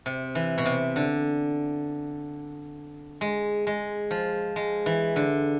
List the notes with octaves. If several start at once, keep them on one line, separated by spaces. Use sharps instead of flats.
C3
E3
B2
C3
D3
G#3
G#3
F3
G#3
E3
D3